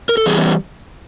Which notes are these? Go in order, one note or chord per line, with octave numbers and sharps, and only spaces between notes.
A#4
A4
E3 G3 B3 G#4